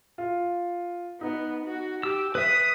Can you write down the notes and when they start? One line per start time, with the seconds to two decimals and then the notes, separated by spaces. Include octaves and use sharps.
0.18 F4
1.21 B3 D#4
1.65 F#4
2.03 G4 E6
2.35 B4 E5 D#6